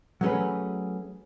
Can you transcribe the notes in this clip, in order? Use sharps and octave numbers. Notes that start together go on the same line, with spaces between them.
F#3 A3 C#4 G#4 B4